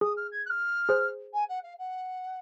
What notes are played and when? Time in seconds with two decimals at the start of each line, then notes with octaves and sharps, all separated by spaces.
0.01 G#4 D#6
0.16 F6
0.31 G#6
0.45 F#6
0.49 F6
0.89 G#4 C5
1.33 G#5
1.48 F#5
1.63 F5
1.78 F#5